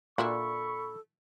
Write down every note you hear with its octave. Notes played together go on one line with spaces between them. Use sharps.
A#2 D4 E4 F#4 A4 B5 C#6